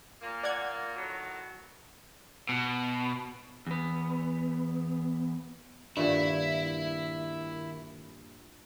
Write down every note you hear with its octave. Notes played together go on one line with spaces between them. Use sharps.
A#2 A#3
D5 F#5 G#6
A2 D#3 F#3
B2
E2 B3
G2 A#2 D#3 E4 E5 F#5